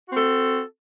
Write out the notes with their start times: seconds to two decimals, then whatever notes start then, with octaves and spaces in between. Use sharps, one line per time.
0.08 F#4
0.13 C4
0.17 A4